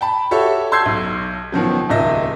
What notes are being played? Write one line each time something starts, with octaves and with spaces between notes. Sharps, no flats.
G5 A5 B5
F#4 G4 A4 C#5 E5
A5 C6 E6 G6 G#6 C7
B1
B2 D#3 F3 F#3
D#1 C#2 D#3 D#5 E5 A#6